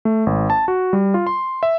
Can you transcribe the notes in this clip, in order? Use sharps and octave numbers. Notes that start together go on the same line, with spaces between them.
A3
G#1
A5
F#4
G3
F4
C6
E5